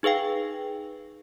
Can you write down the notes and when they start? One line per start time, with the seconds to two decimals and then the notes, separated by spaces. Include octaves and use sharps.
0.03 D#4 G#4 B4 F5 G5